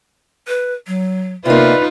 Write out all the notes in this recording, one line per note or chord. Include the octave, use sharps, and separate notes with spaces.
B4
F#3
C3 A#3 D#4 F4 B4 D5